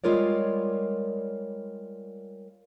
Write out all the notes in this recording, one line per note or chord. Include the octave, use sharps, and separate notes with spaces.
G3 G#3 F4 A#4 C#5 D5